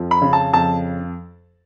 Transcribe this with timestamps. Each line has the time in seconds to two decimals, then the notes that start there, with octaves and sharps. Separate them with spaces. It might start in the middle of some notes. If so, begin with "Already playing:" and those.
Already playing: F2 F3
0.11 B5
0.22 C#3
0.33 A5
0.53 F2 A5